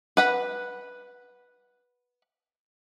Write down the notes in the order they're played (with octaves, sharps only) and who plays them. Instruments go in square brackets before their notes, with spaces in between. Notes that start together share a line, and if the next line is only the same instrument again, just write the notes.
[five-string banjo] B4 F#5 B5